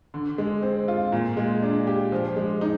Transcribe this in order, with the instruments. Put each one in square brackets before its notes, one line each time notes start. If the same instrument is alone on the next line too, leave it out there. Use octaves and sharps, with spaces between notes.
[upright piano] D3
G#3
C4
F4
A#2
G#3
D4
G4
F3
G#3
D#4